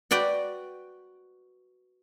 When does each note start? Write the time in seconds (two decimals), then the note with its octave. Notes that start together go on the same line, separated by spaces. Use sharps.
0.11 F#4 B4 D5 G5